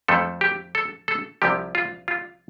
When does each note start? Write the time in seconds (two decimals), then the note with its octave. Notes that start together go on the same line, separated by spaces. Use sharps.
0.08 F2 F3 A3 A4
0.41 G4
0.75 A4
1.08 A4
1.42 C2 C3 F3 G4
1.75 F4
2.08 F4